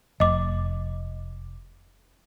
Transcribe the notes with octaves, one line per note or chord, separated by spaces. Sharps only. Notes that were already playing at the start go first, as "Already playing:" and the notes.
F1 D#5 D6